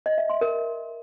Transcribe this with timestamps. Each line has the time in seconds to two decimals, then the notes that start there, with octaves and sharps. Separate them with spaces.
0.06 D#5
0.18 E5
0.30 C6
0.41 A#4